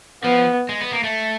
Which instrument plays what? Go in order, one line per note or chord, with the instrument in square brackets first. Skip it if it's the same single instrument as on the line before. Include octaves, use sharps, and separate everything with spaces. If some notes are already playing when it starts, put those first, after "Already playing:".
[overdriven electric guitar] F3 [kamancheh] B3
[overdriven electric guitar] G#3
B3
A#3
A3